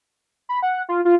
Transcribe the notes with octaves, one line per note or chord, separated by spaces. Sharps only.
B5
F#5
F4
F4